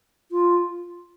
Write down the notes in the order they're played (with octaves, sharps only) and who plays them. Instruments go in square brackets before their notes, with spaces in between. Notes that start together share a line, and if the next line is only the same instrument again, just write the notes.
[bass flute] F4